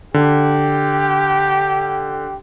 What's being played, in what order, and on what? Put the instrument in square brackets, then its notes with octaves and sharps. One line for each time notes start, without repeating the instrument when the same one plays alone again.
[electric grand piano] D3 [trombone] G4